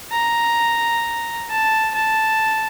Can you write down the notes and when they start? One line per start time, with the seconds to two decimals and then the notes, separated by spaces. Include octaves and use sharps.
0.12 A#5
1.50 A5
1.95 A5